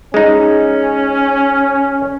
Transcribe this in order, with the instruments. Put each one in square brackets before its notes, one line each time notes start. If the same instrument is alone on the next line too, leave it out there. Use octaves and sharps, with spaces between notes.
[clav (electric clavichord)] G#3 D#4 [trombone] C#4